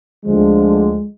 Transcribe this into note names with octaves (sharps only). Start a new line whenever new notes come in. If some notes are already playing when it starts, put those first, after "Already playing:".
D2 D3 F3 G#3